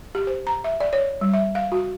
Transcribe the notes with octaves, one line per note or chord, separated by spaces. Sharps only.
G4
C5
A#5
E5
D5
C#5
G3
E5
F5
F#4